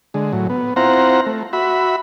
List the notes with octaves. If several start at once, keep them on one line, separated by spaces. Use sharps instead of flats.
D3 G#3
A2 F#3
B3
C4 E4 F4 C5 F#5 A#5
A3
F#4 E5 B5